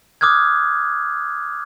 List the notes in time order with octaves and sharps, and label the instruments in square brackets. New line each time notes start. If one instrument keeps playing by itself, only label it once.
[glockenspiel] D6 D#6 F6 F#6 G#6